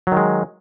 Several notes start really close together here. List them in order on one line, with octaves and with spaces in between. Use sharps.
F#3 D#3 G#3